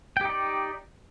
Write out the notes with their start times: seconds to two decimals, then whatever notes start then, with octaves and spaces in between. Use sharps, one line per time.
0.17 G5
0.21 G4
0.25 D#4
0.29 D5